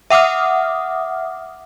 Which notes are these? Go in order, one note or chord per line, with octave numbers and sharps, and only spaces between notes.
E5 F#5 D6 D#6 F6